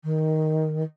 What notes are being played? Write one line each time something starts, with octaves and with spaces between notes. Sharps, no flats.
D#3